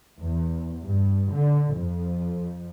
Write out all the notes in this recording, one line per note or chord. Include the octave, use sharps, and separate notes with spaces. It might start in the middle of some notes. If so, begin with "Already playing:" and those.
E2
G2
D3
F2